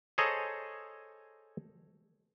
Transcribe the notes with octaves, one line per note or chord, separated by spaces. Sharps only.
G#4 A4 C5 C#5 D#5 A#5